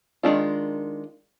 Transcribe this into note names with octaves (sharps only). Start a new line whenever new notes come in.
D#3 G#3 D4 F4